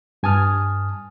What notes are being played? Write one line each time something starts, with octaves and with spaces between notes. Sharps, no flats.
G2 G#5 A5 D#6 F6